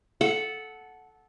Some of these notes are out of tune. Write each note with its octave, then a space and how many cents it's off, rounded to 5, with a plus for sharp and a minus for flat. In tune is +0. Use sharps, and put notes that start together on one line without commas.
A4 -15 F#5 +0